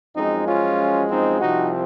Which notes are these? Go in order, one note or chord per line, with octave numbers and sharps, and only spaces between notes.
F#2 F3 G#3 C4 D#4
C#4 F4
C4 D#4
C2 C3 F3 C4 D#4 F#4